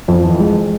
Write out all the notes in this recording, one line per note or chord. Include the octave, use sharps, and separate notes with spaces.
F2
E3
G#3